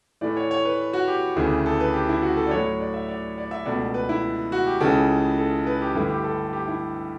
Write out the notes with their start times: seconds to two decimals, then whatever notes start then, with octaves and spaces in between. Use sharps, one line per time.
0.21 A2 E3 A3 D5
0.37 C#5
0.51 C#5
0.65 B4
0.93 F#4
1.08 G4
1.36 D2 C#3 E3 A3
1.66 A4
1.80 B4
1.94 G4
2.09 E4
2.22 F#4
2.37 A4
2.47 D5
2.51 A2 F#3 A3 C#5
2.80 D5
2.94 E5
3.08 D5
3.38 D5
3.51 E5
3.66 C#2 B2 A3 D5
3.94 B4
4.09 E4
4.52 F#4
4.67 G4
4.80 C#2 C#3 E3 A4
5.38 A4
5.66 B4
5.82 G4
5.95 G2 D3 A3 E4
6.09 G4
6.24 A4
6.53 G4
6.68 E4